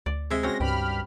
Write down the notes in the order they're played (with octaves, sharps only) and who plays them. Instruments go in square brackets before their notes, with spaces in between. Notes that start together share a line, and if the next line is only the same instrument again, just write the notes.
[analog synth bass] D2 [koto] D5
[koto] C3 E5 [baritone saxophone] G#3
[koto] C4 C#4 F#4 [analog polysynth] A#6
[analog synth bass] C#2 [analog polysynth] G2 B5 F6 [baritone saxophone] G4